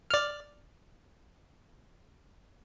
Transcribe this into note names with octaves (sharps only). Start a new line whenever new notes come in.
D5 F6